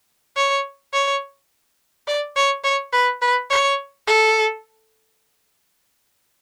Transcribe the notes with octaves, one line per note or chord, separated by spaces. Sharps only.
C#5
C#5
D5
C#5
C#5
B4
B4
C#5
A4